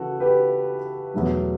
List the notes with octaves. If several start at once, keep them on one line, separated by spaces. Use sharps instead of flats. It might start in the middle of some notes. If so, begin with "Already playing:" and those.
Already playing: C#3 E3 F#4 A4
G4 B4
E2 B2 F#3 A3